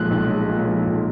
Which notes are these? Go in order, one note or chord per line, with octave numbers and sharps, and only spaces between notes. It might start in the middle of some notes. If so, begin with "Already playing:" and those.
Already playing: B1 A#2 F3 G#3 F#6
B1
G#3
A#2
F3
B1